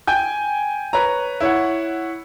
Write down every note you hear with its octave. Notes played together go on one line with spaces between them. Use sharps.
G5 G#5 G6
B4 C#5 A#5
E4 C#5 F#5